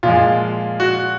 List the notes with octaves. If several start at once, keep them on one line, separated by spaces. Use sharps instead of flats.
A#2 F3 G#3 F4
F#4